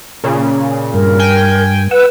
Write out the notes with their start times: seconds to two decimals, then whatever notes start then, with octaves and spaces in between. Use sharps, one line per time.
0.24 A#2 C#3
0.94 G2 A#4
1.19 G5 G#5
1.91 B4 F#5 E6